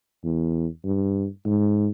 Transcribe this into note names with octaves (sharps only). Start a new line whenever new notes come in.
E2
G2
G#2